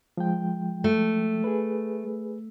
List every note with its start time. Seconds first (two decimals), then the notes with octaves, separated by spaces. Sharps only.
0.17 F3 G#3 G5
0.84 A3
1.44 G#4 B4